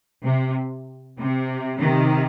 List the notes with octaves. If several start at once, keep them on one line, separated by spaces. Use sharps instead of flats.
C3
C3
C3 D#3